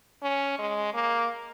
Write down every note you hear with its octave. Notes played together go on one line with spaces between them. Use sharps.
C#4
G#3
A#3